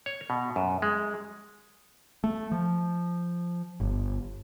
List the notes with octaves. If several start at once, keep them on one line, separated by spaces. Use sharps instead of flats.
C#5
B2
F#2
G#3
A3
F3
G1